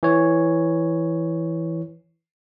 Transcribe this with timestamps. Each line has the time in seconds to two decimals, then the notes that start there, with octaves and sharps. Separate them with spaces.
0.03 E3 C#5